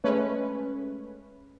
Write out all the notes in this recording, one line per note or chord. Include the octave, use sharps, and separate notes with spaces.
G#3 A3 C#4 B4